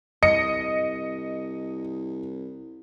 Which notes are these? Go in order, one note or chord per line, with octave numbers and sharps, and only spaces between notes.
C2 D#5 C#7